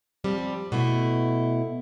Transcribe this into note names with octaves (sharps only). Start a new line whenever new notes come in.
F3 G3 C4
B2 A3 E4